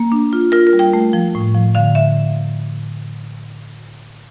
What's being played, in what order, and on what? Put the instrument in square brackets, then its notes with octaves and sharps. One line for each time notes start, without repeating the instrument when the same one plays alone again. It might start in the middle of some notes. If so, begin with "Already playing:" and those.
Already playing: [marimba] A#3
D4
F4
F4 A#4
A#4
G3
G5
A3
F3
A2
F3
D3 F5
D3 E5